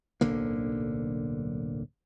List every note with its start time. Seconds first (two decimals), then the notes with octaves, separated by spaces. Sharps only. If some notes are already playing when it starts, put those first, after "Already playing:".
0.21 D1 B1 D3 A#3